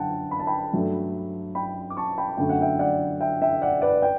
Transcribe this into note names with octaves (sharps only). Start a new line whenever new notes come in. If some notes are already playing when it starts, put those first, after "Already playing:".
Already playing: F#2 D3 F#5 G5 A5
B5
A5
G5 B5
G2 F#3 A3 D4
G5 B5
D6
A5 C#6
G5 B5
F#2 D3 A3 G5
F#5
E5 G5
D5 F#5
E5 G5
E5 G5
D5 F#5
B4 D5
G5